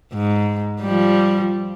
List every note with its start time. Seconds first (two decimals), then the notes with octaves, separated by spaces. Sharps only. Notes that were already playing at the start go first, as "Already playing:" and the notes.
0.14 G#2
0.81 F3 G3